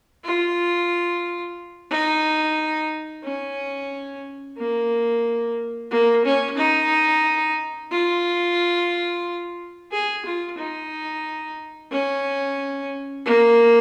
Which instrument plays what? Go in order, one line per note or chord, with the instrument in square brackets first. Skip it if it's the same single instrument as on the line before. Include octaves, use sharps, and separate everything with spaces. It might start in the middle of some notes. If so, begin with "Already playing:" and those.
[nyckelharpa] F4
D#4
C#4
A#3
A#3
C#4
D#4
F4
G#4
F4
D#4
C#4
A#3